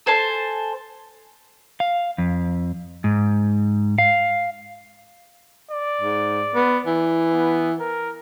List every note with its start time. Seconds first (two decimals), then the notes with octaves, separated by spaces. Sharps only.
0.06 A4 C5 G#5 A5
1.80 F5
2.18 F2
3.04 G#2
3.98 F5
5.71 D5
6.02 G#2
6.56 B3
6.87 E3
7.32 B3
7.80 A#4